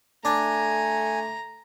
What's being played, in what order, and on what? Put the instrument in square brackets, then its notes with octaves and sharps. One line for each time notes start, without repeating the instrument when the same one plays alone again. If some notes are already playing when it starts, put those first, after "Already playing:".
[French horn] A3 [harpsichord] D4 [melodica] G#5 [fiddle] A#5